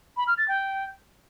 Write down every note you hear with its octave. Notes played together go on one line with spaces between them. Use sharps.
B5
F6
A6
G5